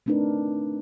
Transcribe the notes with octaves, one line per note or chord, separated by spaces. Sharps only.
A3 C4 D4 D#4 A#4 B4